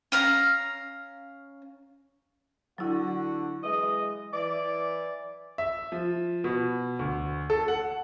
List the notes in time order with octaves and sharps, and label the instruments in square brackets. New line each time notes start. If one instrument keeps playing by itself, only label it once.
[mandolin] C#4 F5 A#5
[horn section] D3 F#4 [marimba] F#3 E4
[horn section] E3 G#3 D#5
E3 D5
[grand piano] E5
F3
B2
D2
A4
F#5